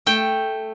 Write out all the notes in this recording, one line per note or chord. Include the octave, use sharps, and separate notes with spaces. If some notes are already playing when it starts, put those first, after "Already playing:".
A3 G5